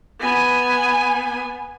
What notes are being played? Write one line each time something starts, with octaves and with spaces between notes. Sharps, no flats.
B3 G#5